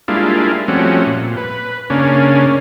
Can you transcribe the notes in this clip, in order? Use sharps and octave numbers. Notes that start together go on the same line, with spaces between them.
G3 G#3 A#3 D4 E4 F4
F3 G3 A3 C4 C#4 F#4
A#2
B4
C#3 A#3 C#4 D4